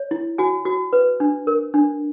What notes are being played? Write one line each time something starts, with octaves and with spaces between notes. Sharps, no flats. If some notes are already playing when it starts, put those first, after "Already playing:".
Already playing: C#5
E4
F#4 G#5
F#4
B4
D4
A#4
D4